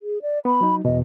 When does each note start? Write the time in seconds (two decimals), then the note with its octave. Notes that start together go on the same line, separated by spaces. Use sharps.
0.02 G#4
0.22 D5
0.45 B3 B5
0.61 F#3 D#4
0.85 E2 B2 D#5